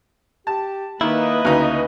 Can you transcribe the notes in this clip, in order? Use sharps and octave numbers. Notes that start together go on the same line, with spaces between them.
G4 A5
D#3 A#3 E4 B4 D#5
D2 C#3 A#3 D#4